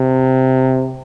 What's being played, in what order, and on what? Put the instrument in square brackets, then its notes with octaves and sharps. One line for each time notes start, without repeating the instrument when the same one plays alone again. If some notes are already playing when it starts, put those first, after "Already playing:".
Already playing: [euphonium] C3